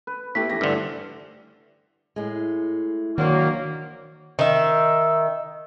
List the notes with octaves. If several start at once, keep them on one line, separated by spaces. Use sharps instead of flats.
B4
A3 B3 E4 G4 B6
E3 G4 A#6
G2 D3 C5 E5
A2 G#3
D#3 F#3 A#3 D4 C5 C#5
D#3 E5